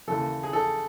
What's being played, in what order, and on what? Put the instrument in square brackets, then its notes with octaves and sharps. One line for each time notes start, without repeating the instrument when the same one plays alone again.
[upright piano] D#2 C#3 E3 A4
G#4
A4